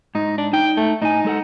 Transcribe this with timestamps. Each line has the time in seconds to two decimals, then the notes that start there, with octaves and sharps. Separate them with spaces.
0.15 G#2 D#4
0.38 D4
0.53 D#4 G5
0.77 A3
1.02 A2 D#4 G#5
1.25 G#3 A4 F#5